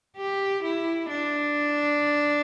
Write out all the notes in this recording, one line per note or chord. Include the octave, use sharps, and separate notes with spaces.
G4
E4
D4